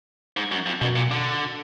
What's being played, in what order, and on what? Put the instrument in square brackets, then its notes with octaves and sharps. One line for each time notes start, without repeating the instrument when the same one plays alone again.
[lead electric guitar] G#2
F#2
F2
[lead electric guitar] F#2 [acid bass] B2
[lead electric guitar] A#2
D3